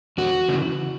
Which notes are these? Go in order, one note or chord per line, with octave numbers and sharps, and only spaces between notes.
E2 F#4
C#3 E3